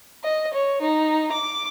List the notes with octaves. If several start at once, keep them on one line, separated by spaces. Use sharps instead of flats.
D#5
C#5
D#4
D6